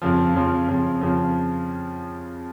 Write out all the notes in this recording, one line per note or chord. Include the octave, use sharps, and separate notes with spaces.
F2 C#3 F3
F2 C#3 F3
F2 C#3 F3
F2 C#3 F3